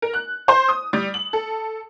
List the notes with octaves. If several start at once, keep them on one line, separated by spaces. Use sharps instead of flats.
A#4
F#6
C5
D#6
G3
F#7
A4